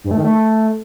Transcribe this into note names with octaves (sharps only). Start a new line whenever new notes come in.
G2
A3
D#3
A3